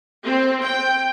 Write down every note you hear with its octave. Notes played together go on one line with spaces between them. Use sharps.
C4
G5